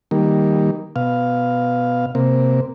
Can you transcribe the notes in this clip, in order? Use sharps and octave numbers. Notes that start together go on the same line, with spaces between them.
D#3 G3 A#3
B2 F5
C3 A#3